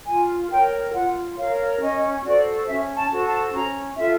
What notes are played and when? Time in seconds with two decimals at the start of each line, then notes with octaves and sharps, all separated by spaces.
0.07 F4 G#5
0.50 A#4 C#5 G5
0.94 F4 F#5
1.37 A#4 C#5 F5
1.80 C#4 D#5
2.24 F#4 A4 C5 D5
2.67 C#4 E5
2.96 A5
3.10 F#4 A4 C5
3.25 A5
3.54 C#4 A#5
3.97 F4 A4 E5